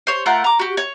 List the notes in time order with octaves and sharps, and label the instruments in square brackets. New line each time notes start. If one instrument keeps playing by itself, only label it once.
[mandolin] C5 C#5
A3 F4 A#4 F#5
A#5 D6
F#4 G4
C#5